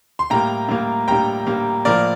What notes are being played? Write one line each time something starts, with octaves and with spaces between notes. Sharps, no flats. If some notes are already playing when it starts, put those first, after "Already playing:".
C6
A2 G3 A#3 G5 A#5
A2 G3 A#3
A2 G3 A#3 G5 A#5
A2 G3 A#3
A2 F3 A#3 A#4 D5